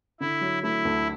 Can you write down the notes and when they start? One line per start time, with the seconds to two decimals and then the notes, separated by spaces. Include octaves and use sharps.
0.21 D3 E4
0.41 F#3
0.63 A3 E4
0.85 D2